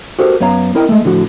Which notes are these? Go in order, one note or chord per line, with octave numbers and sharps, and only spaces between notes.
F#4 G4 A4 A#4 C5 F#5
F#2 B3 C#5 F5 A#5
C4 E4 A#4 D#5 G5
G#3 A3
A2 D3 F3 F#4